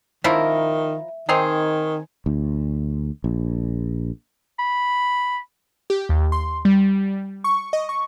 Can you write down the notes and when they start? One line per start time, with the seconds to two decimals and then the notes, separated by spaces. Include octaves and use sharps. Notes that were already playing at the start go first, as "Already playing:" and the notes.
0.24 D#3 F3 E4 A#4 E5
1.29 D#3 C4 D#4 G#4
2.26 D2
3.24 A#1
4.59 B5
5.90 G4
6.09 D#2
6.32 C6
6.65 G3
7.44 C#6
7.73 D#5
7.89 C#6